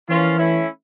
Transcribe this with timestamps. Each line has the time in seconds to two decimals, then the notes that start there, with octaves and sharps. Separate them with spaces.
0.08 E3 F3 A#3 C#4 F4
0.38 A3 C#4 E4